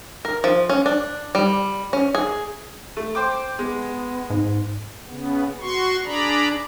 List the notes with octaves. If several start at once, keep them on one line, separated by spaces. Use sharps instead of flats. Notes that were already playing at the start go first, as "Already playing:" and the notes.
A#4
F3
C#4
D4
G3
C#4
G#4
A3
C5 G5 D6
G#3 B3
G#2
C#3 B3
F#4 C6 C#6
D4 G#4 D5 A#5 B5